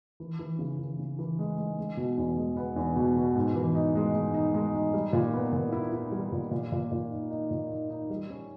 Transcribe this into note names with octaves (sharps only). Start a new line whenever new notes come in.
E3
E3
C#3
E3
C#3
E3
G#3
G#3
G#3
B2
E2
G#3
B3
E2
B2
B2
G#2
E3
D#4
G#3
G#3
D#4
G#3
D#4
G3
A#2
B3
A#2
E4
E4
G3
A#2
A#2
A#2
A#2
D#4
D#4
A#2
D#4
D#4
G3
C#4